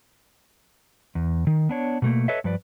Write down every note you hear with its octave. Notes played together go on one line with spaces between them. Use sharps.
E2
D#3
B3 D4 C#5
B2 A3 A#3
A4 B4 C#5 D#5 E5
G2 F3 B4 D5